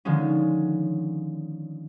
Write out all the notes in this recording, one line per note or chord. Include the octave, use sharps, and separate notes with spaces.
D3 D#3 F3 G#3 C#4